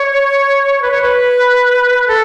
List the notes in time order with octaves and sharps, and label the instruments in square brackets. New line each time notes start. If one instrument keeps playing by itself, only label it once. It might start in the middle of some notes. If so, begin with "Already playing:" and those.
Already playing: [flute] C#5
B4
C#5
B4
A4